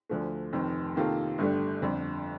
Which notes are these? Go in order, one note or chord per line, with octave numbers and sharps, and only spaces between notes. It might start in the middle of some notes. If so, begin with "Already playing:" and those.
D2 D3 F3 A3
F1 F2 D#3
C3 D#3 A#3 F4 A4
G1 G2 D3 A3
G1 F2 D3